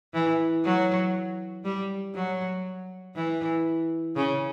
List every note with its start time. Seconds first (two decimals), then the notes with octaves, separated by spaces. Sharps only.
0.14 E3
0.65 F#3
1.65 G3
2.15 F#3
3.16 E3
4.16 C#3